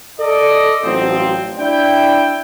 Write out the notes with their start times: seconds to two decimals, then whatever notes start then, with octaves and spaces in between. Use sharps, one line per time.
0.19 A4 D5 D#5
0.84 A1 F3 F#3 C4
1.59 D4 E4 D5 G5